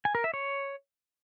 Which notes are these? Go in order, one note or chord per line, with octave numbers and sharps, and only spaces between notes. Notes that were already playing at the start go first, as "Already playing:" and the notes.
G#5
A#4
E5
C#5